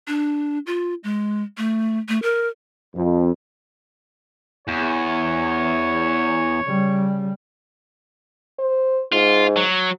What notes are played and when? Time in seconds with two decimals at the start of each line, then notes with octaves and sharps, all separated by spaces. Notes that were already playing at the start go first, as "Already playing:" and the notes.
0.08 D4
0.67 F4
1.04 G#3
1.57 A3
2.09 A3
2.22 A#4
2.96 F2
4.68 E2 C#5
6.64 C#3 G3
8.59 C5
9.12 G#2 F4
9.57 F#3